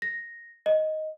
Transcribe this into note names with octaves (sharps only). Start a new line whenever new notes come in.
A#6
D#5